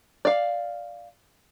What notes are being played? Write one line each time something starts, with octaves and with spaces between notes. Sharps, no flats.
D5 F5